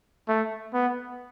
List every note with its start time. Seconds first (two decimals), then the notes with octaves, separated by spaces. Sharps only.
0.28 A3
0.74 B3